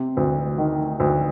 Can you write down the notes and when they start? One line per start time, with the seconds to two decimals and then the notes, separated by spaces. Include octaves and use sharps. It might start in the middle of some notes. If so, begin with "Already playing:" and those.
Already playing: C3
0.17 D2
0.58 D#3
1.00 D2